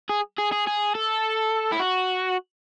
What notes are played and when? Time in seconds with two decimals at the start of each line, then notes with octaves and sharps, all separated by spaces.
0.09 G#4
0.38 G#4
0.52 G#4
0.67 G#4
0.95 A4
1.72 E4
1.80 F#4